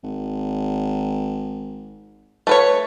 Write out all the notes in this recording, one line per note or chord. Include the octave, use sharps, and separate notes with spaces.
G#1
A3 B4 C#5